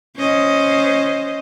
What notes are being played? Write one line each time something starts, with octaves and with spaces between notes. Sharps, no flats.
C#4 C5 D#5